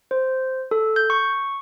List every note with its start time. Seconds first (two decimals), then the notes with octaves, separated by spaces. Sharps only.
0.11 C5
0.71 A4
0.96 G6
1.10 C#6